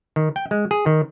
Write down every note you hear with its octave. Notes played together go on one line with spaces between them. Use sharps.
D#3
G5
G#3
G#4
D#3